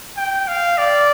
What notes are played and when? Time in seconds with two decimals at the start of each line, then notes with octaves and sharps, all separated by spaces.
0.17 G5
0.48 F5
0.78 D5